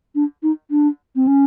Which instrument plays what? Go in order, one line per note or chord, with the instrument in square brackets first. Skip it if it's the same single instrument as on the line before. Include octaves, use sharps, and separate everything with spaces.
[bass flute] D4
D#4
D4
C4
C#4